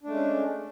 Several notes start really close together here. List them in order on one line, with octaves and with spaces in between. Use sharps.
D4 A3 G#3 C#4